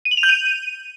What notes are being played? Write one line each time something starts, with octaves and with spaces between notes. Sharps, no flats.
D#7
F#7
F7
G6
D#7